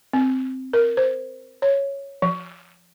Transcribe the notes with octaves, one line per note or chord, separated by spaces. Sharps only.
C4
A#4
C5
C#5
F3